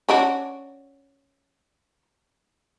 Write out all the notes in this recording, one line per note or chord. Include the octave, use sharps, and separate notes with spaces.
C#4 D4 F#4